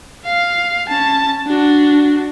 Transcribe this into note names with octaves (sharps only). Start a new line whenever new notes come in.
F5
C#4 A5
D4 F#4